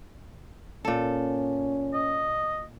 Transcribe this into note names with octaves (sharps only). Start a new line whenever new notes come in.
A#2 C#4 A4
D#5